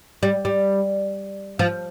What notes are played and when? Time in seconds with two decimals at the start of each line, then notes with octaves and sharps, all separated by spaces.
0.23 G3
0.45 G3
1.59 F3